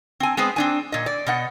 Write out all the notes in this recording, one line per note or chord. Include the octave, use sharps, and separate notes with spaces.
C4 G#5
G#3 B3 C4 C5
C4 D4 G#5
A#2 D#5
D5
B2 D#5 F#5